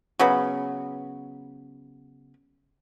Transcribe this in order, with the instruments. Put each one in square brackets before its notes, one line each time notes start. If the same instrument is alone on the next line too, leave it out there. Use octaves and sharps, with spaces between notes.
[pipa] C#3 F#3 B3